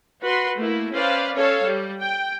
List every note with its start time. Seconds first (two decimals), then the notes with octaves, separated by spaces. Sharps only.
0.22 F#4 B4 C6
0.60 A3 A#3 E4
0.92 C#4 B4 C5 D5 F5
1.34 C#4 A4 C#5 F5
1.64 G3
2.02 G5